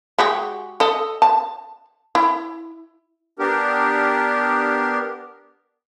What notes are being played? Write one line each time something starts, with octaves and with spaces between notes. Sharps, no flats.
G#3 F#4 G4
A4 D#5
A5
E4
B3 D4 G4 A#4